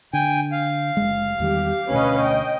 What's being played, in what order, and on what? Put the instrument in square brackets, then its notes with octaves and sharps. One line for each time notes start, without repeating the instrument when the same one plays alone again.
[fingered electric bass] D3 [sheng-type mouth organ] G5 G#5
[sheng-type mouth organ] F5
[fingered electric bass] F#1 G#3
[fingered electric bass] E2 D#3 G3 [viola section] G4
[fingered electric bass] D2 B2 [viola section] C#4 B4 D#5
[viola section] D#5 G5